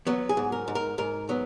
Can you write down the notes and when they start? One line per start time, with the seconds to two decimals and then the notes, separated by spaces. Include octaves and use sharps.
0.07 F#3 B3
0.29 G#4
0.37 G#2
0.52 A#4
0.68 G#2
0.75 A#4
0.98 G#2 A#4
1.29 F#3 B3